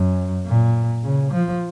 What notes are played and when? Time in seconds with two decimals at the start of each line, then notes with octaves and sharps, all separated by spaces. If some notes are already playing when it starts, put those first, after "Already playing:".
Already playing: F#2
0.47 A#2
1.03 C#3
1.32 F3